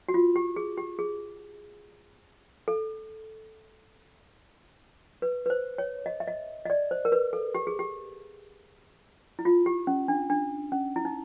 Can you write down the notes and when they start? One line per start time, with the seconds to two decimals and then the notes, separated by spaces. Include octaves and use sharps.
0.09 F#4
0.14 F4
0.36 G4
0.56 G#4
0.77 G4
0.99 G#4
2.68 A4
5.22 B4
5.46 B4
5.50 C5
5.78 C#5
6.06 D#5
6.20 E5
6.27 D#5
6.66 D#5
6.70 D5
6.91 C5
7.05 A#4
7.12 B4
7.33 A4
7.55 G4
7.67 G#4
7.79 G4
9.39 E4
9.45 F4
9.66 G4
9.87 C#4
10.08 D4
10.30 D4
10.72 C#4
10.96 E4
11.05 D#4